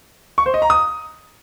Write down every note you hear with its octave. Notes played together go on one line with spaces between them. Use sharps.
C#6
C5
D#5
A#5
D#6